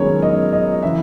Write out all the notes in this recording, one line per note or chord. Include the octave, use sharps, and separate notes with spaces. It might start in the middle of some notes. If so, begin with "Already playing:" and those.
Already playing: F#2 D#3 G#3 B3 A#4 C#5
D#5
D#5
C#3 E3 B3 E5